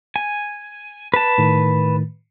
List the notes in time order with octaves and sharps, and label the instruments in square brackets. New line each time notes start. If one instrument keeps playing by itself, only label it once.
[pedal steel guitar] G#5
B4 A5
[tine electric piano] A2 D#3 A3